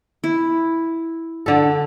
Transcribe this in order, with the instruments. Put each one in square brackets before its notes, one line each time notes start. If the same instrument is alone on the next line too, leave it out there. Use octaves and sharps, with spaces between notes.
[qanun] E4
[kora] D3 A4